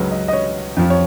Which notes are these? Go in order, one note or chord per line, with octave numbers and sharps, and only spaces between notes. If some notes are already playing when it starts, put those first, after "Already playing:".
Already playing: C#2 C#3 F#3 B4
D#5
D#5
C#5
F2 F3
C#5